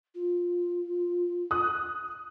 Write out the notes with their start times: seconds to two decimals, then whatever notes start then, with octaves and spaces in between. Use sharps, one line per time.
0.15 F4
1.51 D#6 F#6